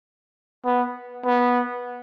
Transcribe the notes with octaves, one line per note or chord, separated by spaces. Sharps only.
B3
B3